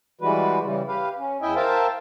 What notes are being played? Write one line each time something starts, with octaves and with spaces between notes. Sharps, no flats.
E3 G3 G#3 F#4 B4
C#3 E3 G3
G4 B4 F5
C#4
E2 E4 D#5 E5 G5 G#5
A#4 C5 E5 F5 G5 A5